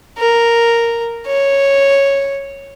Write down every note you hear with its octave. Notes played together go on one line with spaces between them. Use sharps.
A#4
C#5